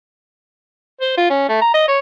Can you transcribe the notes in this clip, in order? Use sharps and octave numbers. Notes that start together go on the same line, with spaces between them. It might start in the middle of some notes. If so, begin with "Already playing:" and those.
C5
F4
C#4
A3
A#5
D#5
C#5